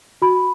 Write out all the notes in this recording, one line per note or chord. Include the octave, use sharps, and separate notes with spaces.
F#4 B5